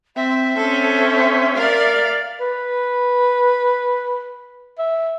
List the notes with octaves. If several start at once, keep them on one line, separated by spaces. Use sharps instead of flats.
C4 E5
C4 C#4 A4
A#4 D5 F5
B4
E5